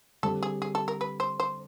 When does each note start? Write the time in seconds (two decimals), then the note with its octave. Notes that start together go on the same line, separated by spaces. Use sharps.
0.23 D3 G3 C4 A4
0.43 G#4
0.62 G#4
0.75 A4
0.88 A#4
1.01 B4
1.20 C5
1.40 C5